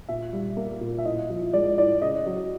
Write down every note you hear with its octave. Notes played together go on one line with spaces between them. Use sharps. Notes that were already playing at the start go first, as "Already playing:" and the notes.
A#2 E5
G3
A#3
A#2
E5
A2 D#5
F3
G#3 D5
A2 D5
C#3 D#5
F#3